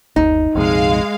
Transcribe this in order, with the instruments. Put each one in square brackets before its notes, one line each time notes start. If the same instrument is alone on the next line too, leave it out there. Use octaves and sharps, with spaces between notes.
[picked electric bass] G1 D#2 [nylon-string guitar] D#4
[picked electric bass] A#1 F2 C3 [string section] G#3 F5